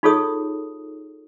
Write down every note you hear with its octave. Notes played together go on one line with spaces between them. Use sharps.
D#4 F4 G#4 A4 C#5 D#6